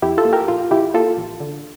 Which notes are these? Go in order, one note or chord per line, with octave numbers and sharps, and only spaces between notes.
F2 E4 G4
F4 A4
A#3
G4 A#4
A#1 F4
A#1 E4 G4
A#3 F4 A4
A1
D3